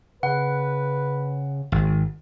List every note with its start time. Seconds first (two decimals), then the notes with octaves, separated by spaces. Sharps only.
0.23 C#3 B4 F#5
1.72 G#1